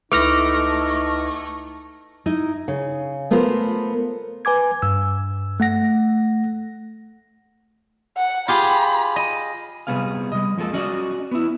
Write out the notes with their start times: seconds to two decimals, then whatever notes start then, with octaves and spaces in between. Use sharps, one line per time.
0.12 C#2 A3 D#4 E4 B4 D6 F6 A#6
2.26 D#4 E4 D#5
2.68 C#3
3.31 A3 B3 F4 A#4 C5
4.45 B4 G#5 D6 G#6
4.82 G2 E6
5.60 A3 F#5 A#6
8.17 F#5
8.48 F4 G4 G#4 B5
9.16 D#5
9.87 C3 D#3 G3 B3 G#4 F5
10.32 G3 D#5
10.57 F3 G#3 A#3 A4
10.73 C#4 F#4 D5 D#5
11.31 B3 E4